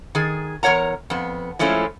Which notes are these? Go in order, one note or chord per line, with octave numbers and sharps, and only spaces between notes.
D#3 G#4
E2 A#4 C#5 F#5 A#5
F2 B3
F3 G#3 A3 C#4 E4